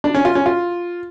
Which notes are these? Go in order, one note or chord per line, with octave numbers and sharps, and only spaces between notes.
D4
C#4
F4
C#4
F4